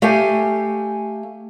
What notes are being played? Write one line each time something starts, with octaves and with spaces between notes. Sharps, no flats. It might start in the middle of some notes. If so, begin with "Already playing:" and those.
A3 G4 F5 G#5